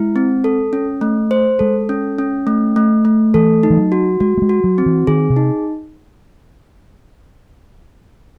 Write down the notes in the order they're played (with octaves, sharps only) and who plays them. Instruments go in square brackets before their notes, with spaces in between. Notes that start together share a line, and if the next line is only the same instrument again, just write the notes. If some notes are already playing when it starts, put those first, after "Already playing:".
Already playing: [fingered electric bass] G#3 [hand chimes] E4
[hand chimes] C4
A4
C#4
A3
C5
[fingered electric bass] G#3 [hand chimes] A4
[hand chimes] C#4
C#4
A3
A3
A3
[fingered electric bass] E3 [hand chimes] A4
[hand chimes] D#4
[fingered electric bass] E3
F#3
[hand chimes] F#4
[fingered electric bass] G#3 [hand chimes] F#4
[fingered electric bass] A3
G#3
[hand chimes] F#4
[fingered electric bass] F#3
[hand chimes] C4
[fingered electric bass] E3
[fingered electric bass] D#3 [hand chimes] G#4
[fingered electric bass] C3
[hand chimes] D#4